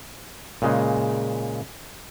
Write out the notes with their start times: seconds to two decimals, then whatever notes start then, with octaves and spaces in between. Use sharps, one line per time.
0.62 A#2 C#3 G#3